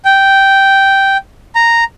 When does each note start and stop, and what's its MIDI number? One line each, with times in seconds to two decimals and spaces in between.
0.05 1.17 79
1.55 1.84 82